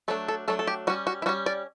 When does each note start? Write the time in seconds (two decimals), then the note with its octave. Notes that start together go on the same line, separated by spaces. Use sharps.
0.08 F#3 A3 D4 A4
0.28 A4
0.48 F#3 A3 D4 A4
0.59 A4
0.67 G4
0.87 G3 C#4 F#4
1.07 F#4
1.22 E4
1.26 G3 C#4 F#4
1.46 D5